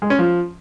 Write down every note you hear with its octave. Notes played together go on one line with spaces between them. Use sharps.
G#3
C#4
F3